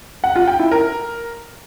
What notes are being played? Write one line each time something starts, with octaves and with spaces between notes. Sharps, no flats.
F#5
F4
G5
E4
A#4